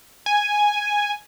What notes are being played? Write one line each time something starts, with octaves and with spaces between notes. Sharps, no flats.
G#5